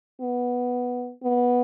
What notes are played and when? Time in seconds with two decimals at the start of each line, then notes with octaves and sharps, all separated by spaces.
0.21 B3
1.23 B3